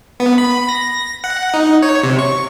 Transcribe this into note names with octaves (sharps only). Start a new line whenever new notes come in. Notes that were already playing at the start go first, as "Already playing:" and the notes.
B3
B5
A#6
F#5
D#4
C#5
C3
C#6